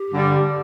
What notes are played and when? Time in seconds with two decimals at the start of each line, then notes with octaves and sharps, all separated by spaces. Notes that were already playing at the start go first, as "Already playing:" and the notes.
Already playing: G4
0.11 G2 D3 G3